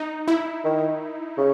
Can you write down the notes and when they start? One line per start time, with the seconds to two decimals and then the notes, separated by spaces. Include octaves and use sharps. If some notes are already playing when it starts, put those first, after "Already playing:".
Already playing: D#4
0.28 E4
0.64 D#3
1.38 C#3